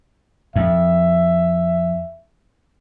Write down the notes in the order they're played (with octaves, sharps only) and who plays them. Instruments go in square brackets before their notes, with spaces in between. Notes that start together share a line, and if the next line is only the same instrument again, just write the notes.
[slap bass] F2 [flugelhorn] E5